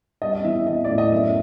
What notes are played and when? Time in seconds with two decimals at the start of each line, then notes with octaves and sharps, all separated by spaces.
0.22 G3 D#5
0.33 D#5
0.45 E3 E5
0.55 E5
0.67 E3 D#5
0.84 A2 D5
0.98 D#5
1.12 F#2 E5